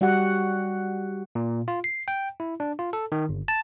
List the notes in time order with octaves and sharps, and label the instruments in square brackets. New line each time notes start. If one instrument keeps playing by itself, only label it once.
[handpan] G3 F#4 G4 F#5
[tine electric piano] A#2
F4
C7
G5
E4
D4
F4
A4
D#3
G1
A5